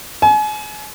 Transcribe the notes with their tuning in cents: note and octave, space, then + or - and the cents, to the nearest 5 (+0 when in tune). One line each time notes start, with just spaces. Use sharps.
G#5 +35